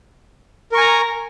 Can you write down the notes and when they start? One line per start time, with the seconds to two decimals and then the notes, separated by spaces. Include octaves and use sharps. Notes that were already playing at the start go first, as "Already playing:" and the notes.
0.72 A#4
0.75 C#6
0.78 G#5
0.80 A#5